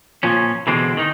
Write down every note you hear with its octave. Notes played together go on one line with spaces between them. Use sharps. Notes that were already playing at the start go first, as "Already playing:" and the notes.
A#2 F3 C#4
B2 D3 E3 G#3 C4
D#3 D#4